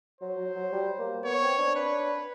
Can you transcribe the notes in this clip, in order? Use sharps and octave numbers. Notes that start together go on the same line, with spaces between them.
F#3 C5
F#3
F#3
G3
A#3
B3 C#5
C4
D4
D4 B4